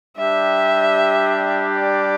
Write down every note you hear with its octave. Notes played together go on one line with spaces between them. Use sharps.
G3 D4 G4 E5
D5